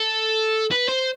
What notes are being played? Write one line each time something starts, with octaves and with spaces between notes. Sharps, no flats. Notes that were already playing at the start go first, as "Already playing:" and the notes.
Already playing: A4
B4
C5